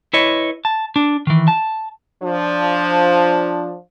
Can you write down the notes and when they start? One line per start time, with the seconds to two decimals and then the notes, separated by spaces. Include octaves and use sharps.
0.13 E4 B4 C#5 D#5
0.65 A5
0.96 D4
1.27 D#3 E3
1.48 A5
2.23 F3 D4